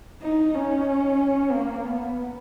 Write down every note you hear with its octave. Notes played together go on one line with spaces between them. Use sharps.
D#4
C#4
A#3
B3